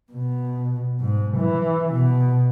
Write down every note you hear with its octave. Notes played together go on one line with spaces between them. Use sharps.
B2
G#2
E3
B2